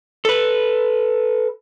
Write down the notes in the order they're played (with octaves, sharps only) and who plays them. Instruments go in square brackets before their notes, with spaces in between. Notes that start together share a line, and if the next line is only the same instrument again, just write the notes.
[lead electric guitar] A4 B4